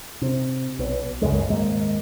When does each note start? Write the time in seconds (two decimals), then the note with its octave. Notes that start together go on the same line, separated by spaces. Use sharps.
0.21 C3
0.79 B1 B2
1.22 C#2 F#2 C#3 G#3
1.47 D#1 G#1 G#3 A#3